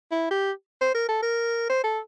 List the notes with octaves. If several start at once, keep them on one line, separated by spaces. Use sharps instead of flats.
E4
G4
C5
A#4
A4
A#4
C5
A4